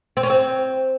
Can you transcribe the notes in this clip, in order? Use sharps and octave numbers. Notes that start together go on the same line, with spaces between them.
C4
C#4
C4